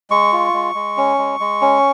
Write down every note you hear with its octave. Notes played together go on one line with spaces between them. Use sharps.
G#3 C#6
F4
G#3
G#3
C#4
G#3
G#3
C#4